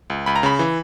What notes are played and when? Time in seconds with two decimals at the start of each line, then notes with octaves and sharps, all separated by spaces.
0.10 C#2
0.26 C#2 B5
0.36 A#5
0.43 C#3 B5
0.59 E3